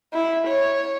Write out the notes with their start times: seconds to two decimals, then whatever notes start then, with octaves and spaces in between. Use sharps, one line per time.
0.14 E4
0.48 C#5